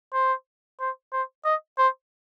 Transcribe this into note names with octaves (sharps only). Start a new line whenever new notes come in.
C5
C5
C5
D#5
C5